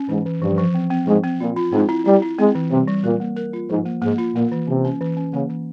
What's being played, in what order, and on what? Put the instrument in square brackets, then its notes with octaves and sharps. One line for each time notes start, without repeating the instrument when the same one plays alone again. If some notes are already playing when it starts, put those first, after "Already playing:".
Already playing: [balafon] C#4
[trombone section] G#2 [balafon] E3
[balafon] E3
[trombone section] G2 [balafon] F3
[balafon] F3
C4
C4
[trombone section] G#2 [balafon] F3
[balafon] C4
[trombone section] A#2 [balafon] F4
[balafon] F4
[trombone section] G#2 [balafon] C4
[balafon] E4
[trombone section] G3 [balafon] E4
[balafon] E4
[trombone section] G#3 [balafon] C4
[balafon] E3
[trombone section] C3 [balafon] G3
[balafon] G3
[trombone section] A#2 [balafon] A#4
[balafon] A#3
A#4
F4
[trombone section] G#2 [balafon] F3
[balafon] A#3
[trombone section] G#2 [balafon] A#3
[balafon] F4
[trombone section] A#2 [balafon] A#3
[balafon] E3
[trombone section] C3 [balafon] C#4
[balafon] C#4
E3
C#4
[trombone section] C#3 [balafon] A#3
[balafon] E3